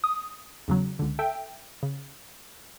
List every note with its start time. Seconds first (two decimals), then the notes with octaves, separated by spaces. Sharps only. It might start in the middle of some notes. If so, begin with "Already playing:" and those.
0.04 D#6
0.68 E2 C#3 F#3
0.99 C#2 D3
1.19 A4 E5 G5
1.83 C#3